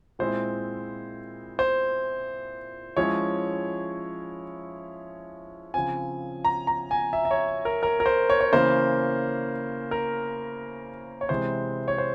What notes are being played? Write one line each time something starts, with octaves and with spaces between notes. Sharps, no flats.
A#2 G#3 C4 E4 C5
C5
F3 G#3 C#4 E4 C#5
C#3 F3 C4 G#5
A#5
A#5
G#5
E5
E5
C#5
A#4
A#4
A#4
C5
C#5
C#5
C#3 E3 A#3 C#4 C5
A#4
C#5
C3 E3 G#3 C5
C#5
C5